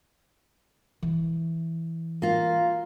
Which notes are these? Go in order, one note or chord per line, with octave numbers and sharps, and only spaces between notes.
E3
A#3 F4